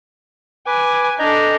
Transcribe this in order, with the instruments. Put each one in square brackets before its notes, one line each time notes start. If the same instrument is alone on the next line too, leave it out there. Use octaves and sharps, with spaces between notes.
[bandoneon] B4 D6 [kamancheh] G#5
[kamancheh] D4 A4 [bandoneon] D#5 A#5 G6